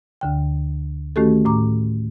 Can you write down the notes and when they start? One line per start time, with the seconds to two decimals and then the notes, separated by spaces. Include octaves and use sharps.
0.21 D2 D3 G5
1.16 D#3 A3 C#4 F#4 G4 A4
1.45 A2 A#5 D6